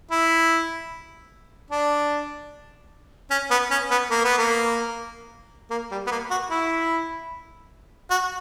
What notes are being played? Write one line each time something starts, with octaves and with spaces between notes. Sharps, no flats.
E4
D4
C#4
B3
C#4
B3
A#3
B3
A#3
A#3
G3
B3
A#3
F#4
E4
F#4